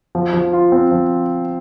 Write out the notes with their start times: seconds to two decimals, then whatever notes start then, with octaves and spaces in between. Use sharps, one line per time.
0.15 F3
0.34 F3
0.53 F4
0.72 C4
0.91 F3